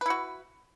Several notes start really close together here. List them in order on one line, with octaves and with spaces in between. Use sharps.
B4 E4 F#4